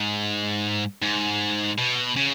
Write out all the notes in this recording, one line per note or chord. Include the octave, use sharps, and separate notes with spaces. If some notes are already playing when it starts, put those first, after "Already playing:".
Already playing: G#2
G#2
B2
C#3